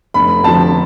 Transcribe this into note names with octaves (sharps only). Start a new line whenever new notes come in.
F1 B5
F2 D3 F3 A5